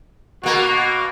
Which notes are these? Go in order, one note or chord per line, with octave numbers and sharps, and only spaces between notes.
B2 A#3 F#4